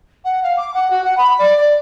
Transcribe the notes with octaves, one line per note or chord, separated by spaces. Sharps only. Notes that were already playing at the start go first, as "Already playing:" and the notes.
F#5
F5
D6
F#5
F#4
F#5
B5
D5
D5